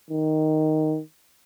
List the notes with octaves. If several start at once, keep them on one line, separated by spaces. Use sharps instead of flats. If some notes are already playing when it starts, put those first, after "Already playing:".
D#3